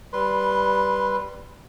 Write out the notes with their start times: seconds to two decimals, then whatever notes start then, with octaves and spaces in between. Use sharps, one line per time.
0.13 G3 B4 C6